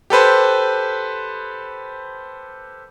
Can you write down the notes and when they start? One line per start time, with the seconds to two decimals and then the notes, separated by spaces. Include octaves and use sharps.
0.10 G4 A4 B4 C5